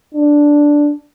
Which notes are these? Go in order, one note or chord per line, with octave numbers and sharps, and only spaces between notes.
D4